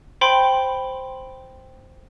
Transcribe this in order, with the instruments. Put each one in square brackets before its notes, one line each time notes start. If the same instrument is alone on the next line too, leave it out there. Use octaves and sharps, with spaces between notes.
[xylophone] C5 G5 B5 C6